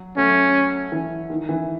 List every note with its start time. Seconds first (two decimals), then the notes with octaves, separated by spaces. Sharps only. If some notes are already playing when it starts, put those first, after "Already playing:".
Already playing: F#3
0.17 F#3 A3 C#4
0.92 E3
1.30 D#3
1.49 E3